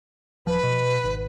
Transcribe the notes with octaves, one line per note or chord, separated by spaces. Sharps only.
D#1 F3 B4
B2
G#1